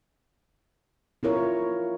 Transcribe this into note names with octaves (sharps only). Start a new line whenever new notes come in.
E4 F4 A#4 C#5